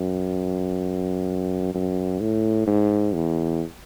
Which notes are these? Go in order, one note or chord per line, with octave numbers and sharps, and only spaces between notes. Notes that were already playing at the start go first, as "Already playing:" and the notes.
Already playing: F#2
F#2
A2
G#2
E2